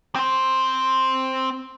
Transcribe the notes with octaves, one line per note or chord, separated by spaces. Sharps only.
C4 C5